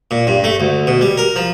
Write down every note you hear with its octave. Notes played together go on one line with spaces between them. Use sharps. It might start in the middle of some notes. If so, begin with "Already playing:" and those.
A#2
G2
A3
D2
B2
G3
A#4
F3